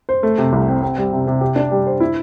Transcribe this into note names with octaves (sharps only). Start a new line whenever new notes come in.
C5
A3
C3
C2
C4
C4
G3
C3
C3
G4
D4
G3
C5
E4